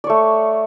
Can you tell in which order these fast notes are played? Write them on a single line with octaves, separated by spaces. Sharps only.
D5 C#5 A3